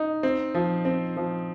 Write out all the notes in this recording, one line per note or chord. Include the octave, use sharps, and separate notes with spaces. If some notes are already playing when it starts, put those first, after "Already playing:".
Already playing: D#4
C4
F3
C4
F3